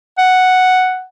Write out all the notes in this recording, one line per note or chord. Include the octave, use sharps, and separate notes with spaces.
F#5